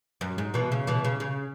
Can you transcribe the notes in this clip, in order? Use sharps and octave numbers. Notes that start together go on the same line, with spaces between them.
F#2
G#2
B2 E3
C#3
B2 E3
C#3
C#3